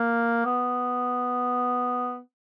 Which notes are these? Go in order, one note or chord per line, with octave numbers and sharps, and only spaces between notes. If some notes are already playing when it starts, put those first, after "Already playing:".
Already playing: A#3
B3